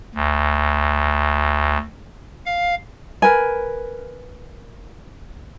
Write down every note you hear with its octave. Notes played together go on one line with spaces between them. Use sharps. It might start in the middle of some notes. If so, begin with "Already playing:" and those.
D2
F5
A#4 B4 G#5